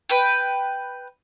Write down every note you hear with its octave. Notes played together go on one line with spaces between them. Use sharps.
B4 G5